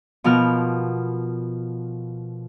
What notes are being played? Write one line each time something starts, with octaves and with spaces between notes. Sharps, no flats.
B2 F3 A#4 F6